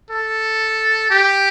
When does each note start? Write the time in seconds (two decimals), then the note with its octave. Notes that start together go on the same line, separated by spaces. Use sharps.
0.11 A4
1.11 G4